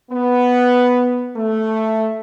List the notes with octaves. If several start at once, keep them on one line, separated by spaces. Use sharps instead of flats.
B3
A3